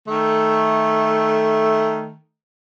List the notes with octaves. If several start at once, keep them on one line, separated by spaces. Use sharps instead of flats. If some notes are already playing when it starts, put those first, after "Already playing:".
D#3 A3